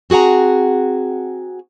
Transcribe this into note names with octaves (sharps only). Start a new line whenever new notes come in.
C4 F#4 G#4 F#5 A#5